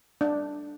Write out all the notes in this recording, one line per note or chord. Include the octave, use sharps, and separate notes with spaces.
D4